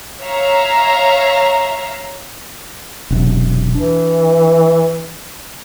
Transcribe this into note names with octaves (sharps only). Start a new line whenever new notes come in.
C#5 E5 F5 A#5
E1 F#2 C3
E3 D4